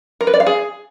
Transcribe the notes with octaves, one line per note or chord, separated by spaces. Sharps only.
A#4
B4
D5
F5
G#4